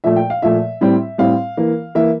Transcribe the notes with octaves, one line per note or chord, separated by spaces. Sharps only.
A#2 F3 A3 E5
G5
F5
A#2 F3 A3 E5
A2 G3 C4
A2 G3 C4 F5
E3 A#3
E3 A#3 E5